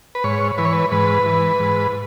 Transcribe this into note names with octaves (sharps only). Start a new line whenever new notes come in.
B4
G#2 C#5
E3 B4
C#5
B4
G#2 B4
E3
G#2